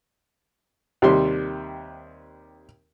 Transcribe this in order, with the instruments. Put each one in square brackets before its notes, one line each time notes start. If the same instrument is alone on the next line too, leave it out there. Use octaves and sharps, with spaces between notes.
[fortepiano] D#2 C3 G3 G4 C6